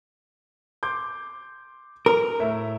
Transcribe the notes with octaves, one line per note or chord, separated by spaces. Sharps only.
C6 D6 G6
A#4
A2 E5